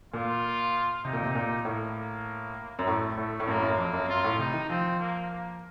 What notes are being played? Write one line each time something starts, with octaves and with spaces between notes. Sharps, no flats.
A#2 F4
C3 D#4
A#2
C3
A#2
A2 A#3
A#3
F#2
A2 A3
A2 A3
A2
F#2 A#3
A2
F#2
F2 A#3
F#2
F#2 F4
A2
C3 D#4
D#3
F3 C4
A#3
A#3